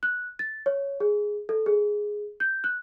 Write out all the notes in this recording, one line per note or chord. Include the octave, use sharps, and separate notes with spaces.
F#6
A6
C#5
G#4
A4
G#4
G6
F#6